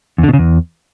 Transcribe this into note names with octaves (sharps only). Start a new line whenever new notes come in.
E2
D3
B2
C#3
E2